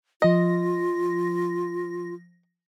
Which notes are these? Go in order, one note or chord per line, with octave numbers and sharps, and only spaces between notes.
F3 F4 D#5 A#6